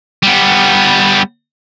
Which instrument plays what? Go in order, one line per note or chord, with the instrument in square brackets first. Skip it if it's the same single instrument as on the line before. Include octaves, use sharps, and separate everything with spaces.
[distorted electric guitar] G3 B3